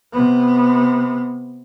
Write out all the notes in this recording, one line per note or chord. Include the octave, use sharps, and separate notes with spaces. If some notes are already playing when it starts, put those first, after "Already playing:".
C3 B3